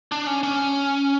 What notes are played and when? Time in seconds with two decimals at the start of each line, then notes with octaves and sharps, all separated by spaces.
0.12 D4
0.27 C#4
0.43 C#4